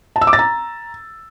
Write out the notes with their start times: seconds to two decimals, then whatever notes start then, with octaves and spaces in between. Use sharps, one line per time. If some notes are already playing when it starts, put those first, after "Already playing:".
0.16 A5
0.21 E6
0.27 D6
0.33 A6
0.39 A#5